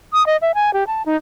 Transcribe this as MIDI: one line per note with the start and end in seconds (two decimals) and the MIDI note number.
0.13 0.25 87
0.26 0.37 75
0.42 0.52 76
0.55 0.73 80
0.74 0.84 67
0.87 1.02 81
1.06 1.16 63